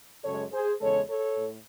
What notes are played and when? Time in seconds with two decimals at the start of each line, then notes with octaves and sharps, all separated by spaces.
0.24 F#2 C#3 G#3 A4 C#5
0.52 G#4 C5
0.81 E2 C#3 G#3 A4 C#5
1.09 A4 C#5
1.37 A2